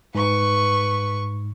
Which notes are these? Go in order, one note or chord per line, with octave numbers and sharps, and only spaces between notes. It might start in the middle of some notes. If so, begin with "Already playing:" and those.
G#2 B4 C#6